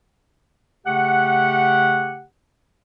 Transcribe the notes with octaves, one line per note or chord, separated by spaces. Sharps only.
C#3 A3 G4 F#5